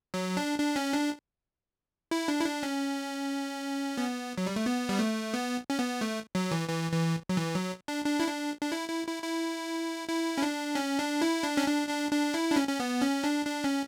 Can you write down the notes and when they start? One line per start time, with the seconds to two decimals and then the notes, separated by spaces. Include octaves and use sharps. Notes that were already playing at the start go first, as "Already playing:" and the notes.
0.14 F#3
0.37 D4
0.59 D4
0.76 C#4
0.92 D4
2.11 E4
2.28 D4
2.40 E4
2.46 D4
2.63 C#4
3.98 B3
4.38 F#3
4.46 G3
4.56 A3
4.66 B3
4.89 G3
4.99 A3
5.34 B3
5.70 C#4
5.79 B3
6.01 A3
6.35 F#3
6.51 E3
6.69 E3
6.92 E3
7.29 F#3
7.37 E3
7.54 F#3
7.88 D4
8.05 D4
8.20 E4
8.28 D4
8.61 D4
8.72 E4
8.89 E4
9.07 E4
9.23 E4
10.08 E4
10.38 C#4
10.42 D4
10.75 C#4
10.99 D4
11.22 E4
11.43 D4
11.57 C#4
11.67 D4
11.89 D4
12.11 D4
12.34 E4
12.51 D4
12.56 C#4
12.68 C#4
12.80 B3
13.02 C#4
13.24 D4
13.46 D4
13.64 C#4